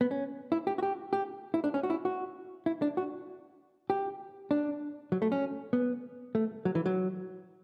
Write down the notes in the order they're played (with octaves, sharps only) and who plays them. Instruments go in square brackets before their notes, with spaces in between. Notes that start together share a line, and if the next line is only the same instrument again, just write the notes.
[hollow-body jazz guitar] B3
C#4
E4
G4
F#4
G4
G4
E4
D4
C#4
F#4
E4
F#4
E4
D4
F#4
G4
D4
F#3
A3
C#4
B3
A3
F#3
E3
F#3